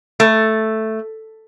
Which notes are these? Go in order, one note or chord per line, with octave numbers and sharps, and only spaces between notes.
A3